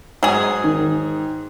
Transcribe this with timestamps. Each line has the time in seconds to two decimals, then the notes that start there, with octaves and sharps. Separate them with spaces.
0.23 G#2 F#3 G#4
0.64 D#3